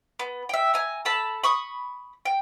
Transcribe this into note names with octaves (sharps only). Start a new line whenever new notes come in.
B3
E5 G5
G#5 A#5
A4 A5 B5
B5 C#6 D#6
G5